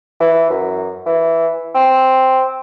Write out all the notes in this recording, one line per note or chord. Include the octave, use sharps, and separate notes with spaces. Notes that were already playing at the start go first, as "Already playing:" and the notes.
E3
F#2
E3
C4